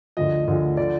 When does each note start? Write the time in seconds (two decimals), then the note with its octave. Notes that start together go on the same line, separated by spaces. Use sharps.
0.17 D2 D3 F3 D#5
0.48 D2 D3 F3
0.77 D3 F3 D5